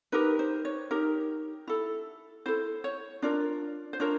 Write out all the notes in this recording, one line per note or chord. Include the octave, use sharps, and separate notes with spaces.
D#4 G4 A#4 B4
C5
C#5
D#4 G4 A#4
E4 A4
E4 A4 C5
C#5
D4 F4 A#4 D5
C5
D4 F4 A#4 C#5